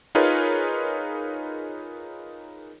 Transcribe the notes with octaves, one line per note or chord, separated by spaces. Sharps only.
D#4 F4 G#4 A#4 B4 C#5